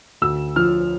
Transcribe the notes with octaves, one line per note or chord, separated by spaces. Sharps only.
D2 E6
F3 F6